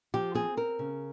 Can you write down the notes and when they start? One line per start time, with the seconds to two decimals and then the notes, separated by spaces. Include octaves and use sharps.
0.14 F3 G4
0.35 C4 G#4
0.57 C4 A#4
0.79 C#3